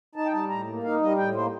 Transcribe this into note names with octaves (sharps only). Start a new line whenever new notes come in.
D#4 A5
G5
G3 A5
A2 A#5
A#3
D#4 F5
G3 D#5
A2 G5
A#3 C5